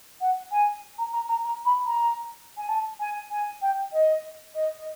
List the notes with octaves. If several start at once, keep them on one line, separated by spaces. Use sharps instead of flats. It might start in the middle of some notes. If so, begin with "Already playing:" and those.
F#5
G#5
A#5
A#5
A#5
A#5
B5
A#5
G#5
A5
G#5
G#5
G5
D#5
D#5
D#5